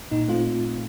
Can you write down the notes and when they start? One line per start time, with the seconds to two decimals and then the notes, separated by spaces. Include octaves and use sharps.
0.11 A#2 D#4
0.28 A3 C4 F4